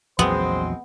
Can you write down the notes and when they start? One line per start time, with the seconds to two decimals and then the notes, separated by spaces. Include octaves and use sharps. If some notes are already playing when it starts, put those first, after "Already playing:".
0.19 A#1 E2 F#3 G#3 B3 C4 C5